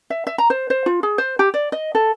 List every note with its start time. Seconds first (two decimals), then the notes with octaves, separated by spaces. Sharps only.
0.10 E5
0.27 E5
0.38 A#5
0.50 C5
0.70 C5
0.86 F4
1.03 G#4
1.18 C5
1.39 G4
1.54 D5
1.72 D#5
1.95 A4